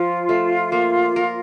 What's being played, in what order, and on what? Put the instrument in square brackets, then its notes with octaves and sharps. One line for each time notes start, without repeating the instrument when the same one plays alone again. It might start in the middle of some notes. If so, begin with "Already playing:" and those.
Already playing: [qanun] F3 [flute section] F4
[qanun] A3
A#3
A#4